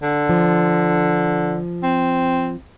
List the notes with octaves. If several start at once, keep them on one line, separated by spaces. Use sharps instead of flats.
D3
F3
C4